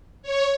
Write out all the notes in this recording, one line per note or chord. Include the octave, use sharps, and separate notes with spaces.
C#5